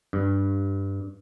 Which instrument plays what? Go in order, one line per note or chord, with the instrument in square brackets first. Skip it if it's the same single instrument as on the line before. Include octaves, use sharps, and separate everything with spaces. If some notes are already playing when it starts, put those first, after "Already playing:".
[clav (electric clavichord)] G2